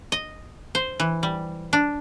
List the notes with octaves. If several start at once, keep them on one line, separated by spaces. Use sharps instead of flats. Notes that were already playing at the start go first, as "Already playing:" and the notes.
D#5
C5
E3
G3
D4